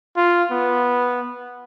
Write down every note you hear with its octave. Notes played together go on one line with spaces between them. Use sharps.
F4
B3